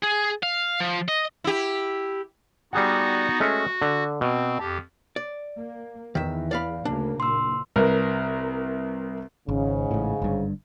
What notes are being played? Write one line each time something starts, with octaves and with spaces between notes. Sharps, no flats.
G#4
F5
F3
D#5
E4 G4
G3 B3 D#4 F#4 G#4 F#5
G#3 A3 C#4 F#4
D3
B2 C4
F2 G4 A5
D5
A#3
E2 D#3 E5
D5 F5 B5
D2 C#3 A#3 D4
F#1 A#2 C6 E6
C2 A#4 B4
G#1 G#2 C#3
A1 A2
G1 G2